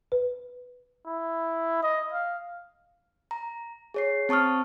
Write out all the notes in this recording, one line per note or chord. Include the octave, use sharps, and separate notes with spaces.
B4
E4
D#5
F5
A#5
G#4 C#5 C7
C4 A5 C#6 D#6 F6